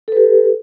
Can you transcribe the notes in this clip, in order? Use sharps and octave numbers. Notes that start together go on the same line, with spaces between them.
G4 A4 B4